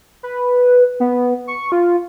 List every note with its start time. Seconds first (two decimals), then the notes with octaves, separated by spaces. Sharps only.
0.23 B4
1.00 B3
1.47 C#6
1.72 F4